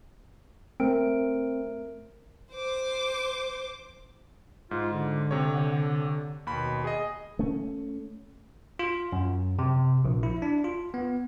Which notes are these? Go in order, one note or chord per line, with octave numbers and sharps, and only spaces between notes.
A3 C4 A#4 D7
C5 D6
G#2 F4
D3
C3 C#5
D#2 B2 B5
G#4 D#5
A3 C#4
F4
F#2
C3
A#1
E4
D4
F4
B3